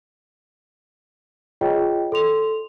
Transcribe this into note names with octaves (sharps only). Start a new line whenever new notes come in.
F4 G#4 C#5 D#5 G5
A4 C6 F7